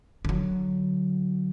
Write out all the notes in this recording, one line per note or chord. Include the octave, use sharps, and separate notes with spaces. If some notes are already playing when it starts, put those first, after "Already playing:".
D3 F#3